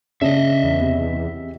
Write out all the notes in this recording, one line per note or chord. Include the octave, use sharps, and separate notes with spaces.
C#3 D4 D#5 E5
E2
C3